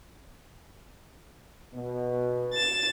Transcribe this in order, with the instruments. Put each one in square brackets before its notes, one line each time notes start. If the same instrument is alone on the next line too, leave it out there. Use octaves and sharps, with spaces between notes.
[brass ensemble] B2
[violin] A6 E7